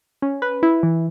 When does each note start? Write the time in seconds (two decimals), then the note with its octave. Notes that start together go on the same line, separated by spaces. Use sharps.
0.22 C#4
0.42 B4
0.63 E4
0.83 E3